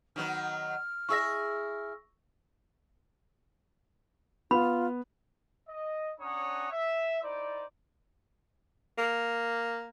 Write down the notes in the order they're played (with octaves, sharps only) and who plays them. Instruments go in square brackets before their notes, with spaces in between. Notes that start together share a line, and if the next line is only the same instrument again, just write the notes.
[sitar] D#3 F#3 B3 [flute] F6
[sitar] E4 G#4 E5 [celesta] C#6 E6 A#6
[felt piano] B3 [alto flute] F4 [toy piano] B5
[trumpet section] D#5
C#4 D4 C#5 F#5 A#5 D#6
E5
D#4 E4 C5 D5
[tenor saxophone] A#3